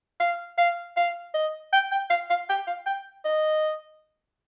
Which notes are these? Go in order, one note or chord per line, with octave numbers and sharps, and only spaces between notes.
F5
F5
F5
D#5
G5
G5
F5
F5
G5
F5
G5
D#5